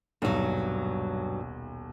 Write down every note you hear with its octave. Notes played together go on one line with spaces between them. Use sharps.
D#1 B1 G2 F#3